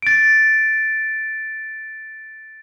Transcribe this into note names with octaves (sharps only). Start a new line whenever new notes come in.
A6 D7